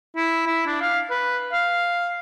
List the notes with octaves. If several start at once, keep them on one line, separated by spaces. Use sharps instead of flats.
E4
E4
D4
F5
B4
F5